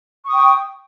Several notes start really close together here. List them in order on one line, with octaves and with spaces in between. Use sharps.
C#6 D#6 G5